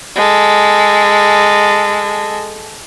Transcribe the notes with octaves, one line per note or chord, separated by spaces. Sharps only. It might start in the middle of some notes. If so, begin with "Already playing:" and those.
G#3 A4